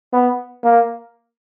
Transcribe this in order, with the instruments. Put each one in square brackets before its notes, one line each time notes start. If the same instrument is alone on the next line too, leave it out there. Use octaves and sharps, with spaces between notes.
[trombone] B3
A#3